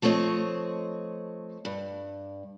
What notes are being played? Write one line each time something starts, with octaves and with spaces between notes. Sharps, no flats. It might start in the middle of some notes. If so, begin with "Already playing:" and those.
F3 A3 C4 C#5 D#5
G2